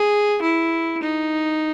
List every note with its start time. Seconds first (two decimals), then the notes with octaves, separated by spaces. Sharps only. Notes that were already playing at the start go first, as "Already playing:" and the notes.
Already playing: G#4
0.42 E4
1.03 D#4